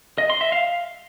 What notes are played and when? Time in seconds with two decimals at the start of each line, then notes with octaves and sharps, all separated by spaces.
0.18 D#5
0.30 C6
0.41 E5
0.52 F5